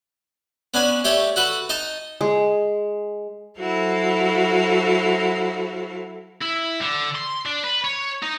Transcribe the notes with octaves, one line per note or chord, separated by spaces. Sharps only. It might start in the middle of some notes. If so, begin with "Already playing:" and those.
B3 C#4 D4 G#5
A3 G4 A4 C#5 D5
F#4 A4 B4 F#5
D#4 D#5 A5
G#3
F#3 E4 F#4 A4 C5 F5
E4
D3
C6
D4
B4
C#5
D#4